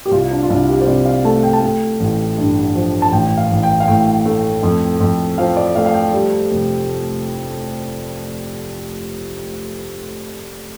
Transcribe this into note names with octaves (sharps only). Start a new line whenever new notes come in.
G4
C2 F4
D4
F4
C2 D4
G4
C5
C3 D5
F5
A3 A5
G5
A5
A3 G5
A1
G2
F3
A5
A1 G5
F5
A1
G5
F5
A2 G5
A3
F2
F2
F3 F5
D5
A3 F5
F5
G5
G3
F1